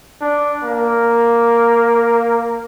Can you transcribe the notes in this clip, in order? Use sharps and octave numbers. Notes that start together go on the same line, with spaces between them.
D4
A#3